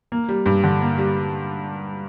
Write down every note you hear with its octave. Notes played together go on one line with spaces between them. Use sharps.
A#3
G3
G2
D3
A#3
G3